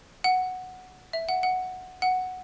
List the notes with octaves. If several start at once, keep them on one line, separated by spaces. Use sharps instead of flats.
F#5
E5
F#5
F#5
F#5